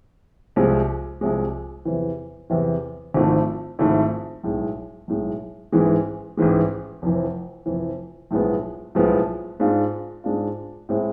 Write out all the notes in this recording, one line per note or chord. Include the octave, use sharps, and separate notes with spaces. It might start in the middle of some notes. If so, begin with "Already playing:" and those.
C2 C3 F3 G#3
C2 C3 F3 G#3
E2 C3 E3
E2 C3 E3
G#1 G#2 F3 A3 E4
G#1 G#2 F3 A3 E4
B1 A2 G#3
B1 A2 G#3
A1 G#2 E3 G#3
A1 G#2 E3 G#3
F1 F2 E3
F1 F2 E3
B1 A2 F3 G#3 B3
B1 A2 F3 G#3 B3
G#2 G#3 D4 F4
G#2 G#3 D4 F4
A2 G#3 C4 E4